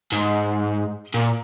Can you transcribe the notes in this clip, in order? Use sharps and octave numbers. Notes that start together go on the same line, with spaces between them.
G#2
A#2